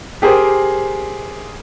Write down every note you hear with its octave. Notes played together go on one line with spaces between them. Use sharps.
G4 G#4 A#4 C5